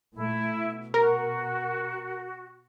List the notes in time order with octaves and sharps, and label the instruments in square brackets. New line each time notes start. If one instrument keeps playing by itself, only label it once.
[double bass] A#2 A3 [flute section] E4
[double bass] B2
[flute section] F#4 [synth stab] A#4